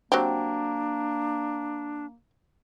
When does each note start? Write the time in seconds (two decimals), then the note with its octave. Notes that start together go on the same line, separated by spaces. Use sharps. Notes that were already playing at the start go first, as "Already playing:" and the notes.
0.12 F#3 A#3 C4 D4 G4